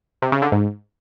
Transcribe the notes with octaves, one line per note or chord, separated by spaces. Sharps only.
C3
C#3
D3
G#2